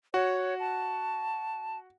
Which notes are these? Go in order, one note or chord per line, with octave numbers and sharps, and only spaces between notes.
F#4 C#5 F#5
A5